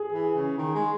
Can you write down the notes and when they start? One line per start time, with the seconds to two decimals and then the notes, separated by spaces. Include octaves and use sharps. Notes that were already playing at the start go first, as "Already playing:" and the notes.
Already playing: G#4
0.12 E3
0.35 C#3
0.58 D#3
0.75 G#3